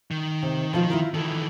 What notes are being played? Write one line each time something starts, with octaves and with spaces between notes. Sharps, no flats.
D#3
C3
B2 D#3 F3 F4
E4 F4 A#4
D#3 E3 A4